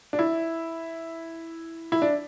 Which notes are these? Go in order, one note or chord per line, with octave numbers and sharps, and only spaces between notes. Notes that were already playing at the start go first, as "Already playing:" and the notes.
D4
E4
E4
D4